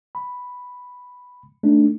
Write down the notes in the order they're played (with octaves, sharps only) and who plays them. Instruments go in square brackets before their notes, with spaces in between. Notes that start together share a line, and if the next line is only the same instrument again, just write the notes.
[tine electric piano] B5
A3 D4 D#4